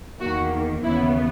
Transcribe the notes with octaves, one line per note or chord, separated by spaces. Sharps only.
E2 D#3 A#3 F#4
D#2 C#3 E3 B3 E4